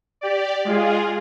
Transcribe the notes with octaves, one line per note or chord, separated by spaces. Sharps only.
G4 D5
G#3 F4 G#4